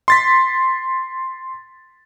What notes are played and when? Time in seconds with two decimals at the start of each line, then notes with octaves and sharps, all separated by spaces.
0.08 C6 A6 B6